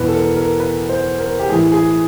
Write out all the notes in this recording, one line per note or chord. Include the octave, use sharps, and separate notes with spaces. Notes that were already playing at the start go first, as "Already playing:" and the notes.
Already playing: E2 B2 B4
A4
A#4
A#4
B4
C5
A#4
G4
A2 E3 G#4
G#4